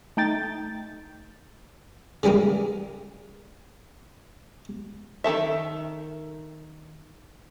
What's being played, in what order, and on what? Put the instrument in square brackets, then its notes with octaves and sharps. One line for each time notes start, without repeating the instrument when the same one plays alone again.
[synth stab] A3 D#4 G5 A6
[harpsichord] C#3 E3 G3 G#3 A#3
[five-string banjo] D#3 C4 A4 E5